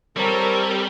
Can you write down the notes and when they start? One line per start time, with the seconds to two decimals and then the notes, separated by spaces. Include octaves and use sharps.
0.16 G3 C4 A4 A#4 C#5